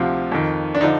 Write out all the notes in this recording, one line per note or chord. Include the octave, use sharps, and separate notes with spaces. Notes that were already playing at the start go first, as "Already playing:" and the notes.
Already playing: D2 C3 F3 F4
F2 D#3
D4
D3 F3 D#4